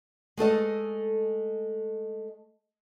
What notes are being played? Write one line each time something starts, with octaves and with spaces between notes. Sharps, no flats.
G#3 A3 A4 D#5